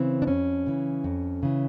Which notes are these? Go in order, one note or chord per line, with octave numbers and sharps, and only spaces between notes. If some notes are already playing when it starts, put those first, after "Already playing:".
Already playing: C#3 E3 C4
D4
F2 C#4
C#3 E3
F2
C#3 E3